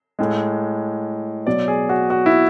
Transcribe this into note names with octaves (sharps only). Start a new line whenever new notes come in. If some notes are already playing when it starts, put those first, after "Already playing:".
A2 G#3
B2 F#3 D5
G#4
F#4
F#4
E4